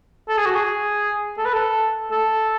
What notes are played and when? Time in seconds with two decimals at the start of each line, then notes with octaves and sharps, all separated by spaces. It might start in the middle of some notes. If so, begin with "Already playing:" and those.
0.29 A4
0.37 G#4
0.46 F#4
0.55 G#4
1.38 A4
1.45 B4
1.54 A4
2.11 A4